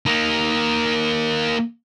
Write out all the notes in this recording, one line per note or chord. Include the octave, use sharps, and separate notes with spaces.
A#3 D#4